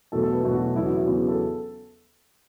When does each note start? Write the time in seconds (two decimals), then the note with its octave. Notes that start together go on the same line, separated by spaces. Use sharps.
0.12 E2 B2 F#3 A3 A4
0.23 A4
0.33 B4
0.43 E2 B2 F#3 A3 A4
0.54 F#4
0.65 E4
0.76 E2 C#3 F#3 B3 E4
0.86 F#4
0.96 E4
1.06 E2 C#3 F#3 B3 F#4
1.17 G#4
1.28 A4